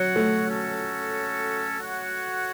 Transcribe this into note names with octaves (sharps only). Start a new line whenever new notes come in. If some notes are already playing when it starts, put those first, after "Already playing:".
Already playing: F#3 C#4 F#4 C#5 F#5
A3
C#4 F#4 A4
F#4 C#5 F#5